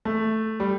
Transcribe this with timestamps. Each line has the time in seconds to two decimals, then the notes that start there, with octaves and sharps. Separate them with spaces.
0.05 A3
0.60 G3